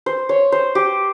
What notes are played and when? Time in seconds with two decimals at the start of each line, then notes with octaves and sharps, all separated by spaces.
0.06 C5
0.29 C#5
0.52 C5
0.75 G4